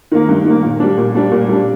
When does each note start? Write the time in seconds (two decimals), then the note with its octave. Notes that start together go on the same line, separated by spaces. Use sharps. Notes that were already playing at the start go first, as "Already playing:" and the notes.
0.12 D#3 A#3
0.28 G2
0.45 D#3 A#3
0.63 A#2
0.80 G3 D4
0.97 A#2
1.15 G3 D4
1.32 A#2
1.49 G3 D4